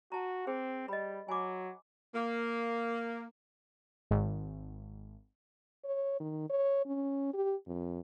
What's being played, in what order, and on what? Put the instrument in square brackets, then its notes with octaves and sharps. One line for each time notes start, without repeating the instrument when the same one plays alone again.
[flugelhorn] F#4 [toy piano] A5 A#5
[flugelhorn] C4 [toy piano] G#4 C5
[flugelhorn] G3 [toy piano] D#5 B5
[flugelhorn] F#3 [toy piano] G#5 B5 D6
[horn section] A#3
[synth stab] G#1
[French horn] C#5
D#3
C#5
C#4
G4
F2